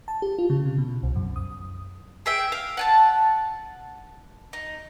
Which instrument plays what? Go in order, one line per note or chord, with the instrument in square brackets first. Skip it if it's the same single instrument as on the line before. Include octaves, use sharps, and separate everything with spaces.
[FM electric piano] A5
G4
F4
C#3
C3
B2
C2
F#2
D#6
[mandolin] G#4 E5 G5
F5
F#5 G#5 A5
D#4